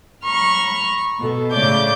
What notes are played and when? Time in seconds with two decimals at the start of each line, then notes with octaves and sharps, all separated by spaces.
0.24 A#5 B5 C#6 F6
1.20 B2 A4
1.52 A2 C#3 A3 D5 D6 G6